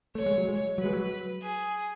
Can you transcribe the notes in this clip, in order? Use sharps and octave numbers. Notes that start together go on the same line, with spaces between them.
A3 C#5
G#3
F#3
G#3
F#3 B4
G#3
F#3
G#4